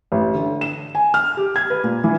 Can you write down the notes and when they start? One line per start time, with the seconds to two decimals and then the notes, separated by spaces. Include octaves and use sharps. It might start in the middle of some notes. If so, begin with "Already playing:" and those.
0.12 A1
0.34 D3
0.61 E7
0.95 G#5
1.14 F6
1.37 G4
1.56 G#6
1.70 B4
1.84 A#2
2.04 E3